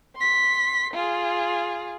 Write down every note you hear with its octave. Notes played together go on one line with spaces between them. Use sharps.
C6 B6
F4 G#4